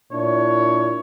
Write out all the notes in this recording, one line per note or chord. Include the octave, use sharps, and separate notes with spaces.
A#2 D4 E4 C#5